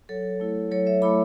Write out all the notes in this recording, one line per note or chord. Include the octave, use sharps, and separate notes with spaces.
F#3 A4 C#5
A3 E4
F#3 A4 C#5
C#5 E5
A3 E4 B5 D6